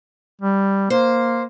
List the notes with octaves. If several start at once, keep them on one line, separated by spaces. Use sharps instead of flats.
G3
A#3 C5